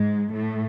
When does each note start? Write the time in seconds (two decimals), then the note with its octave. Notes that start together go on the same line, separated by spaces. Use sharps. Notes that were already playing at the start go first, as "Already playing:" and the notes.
Already playing: G#2 G#3
0.33 A2 A3